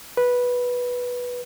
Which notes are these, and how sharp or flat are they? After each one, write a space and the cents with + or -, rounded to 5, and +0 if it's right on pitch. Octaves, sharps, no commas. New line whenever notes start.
B4 -10